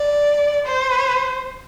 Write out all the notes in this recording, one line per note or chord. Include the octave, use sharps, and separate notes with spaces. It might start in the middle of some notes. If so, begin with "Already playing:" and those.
Already playing: D5
C5